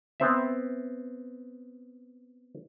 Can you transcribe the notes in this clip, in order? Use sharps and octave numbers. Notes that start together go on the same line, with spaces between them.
B3 C4 E5